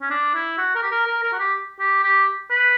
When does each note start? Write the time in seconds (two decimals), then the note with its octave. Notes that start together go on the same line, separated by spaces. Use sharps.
0.02 C#4
0.10 D4
0.34 E4
0.58 F#4
0.75 A#4
0.82 G4
0.91 A#4
1.06 A#4
1.23 A#4
1.33 F#4
1.39 G4
1.79 G4
2.03 G4
2.50 B4